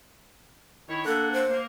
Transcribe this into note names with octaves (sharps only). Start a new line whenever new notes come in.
D#3 E4 C#5
A#3 D4 A4 F#5
C5
A#3